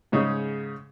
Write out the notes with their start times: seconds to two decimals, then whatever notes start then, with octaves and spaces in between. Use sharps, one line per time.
0.12 G#2 C#3 C#4 D#4 G#4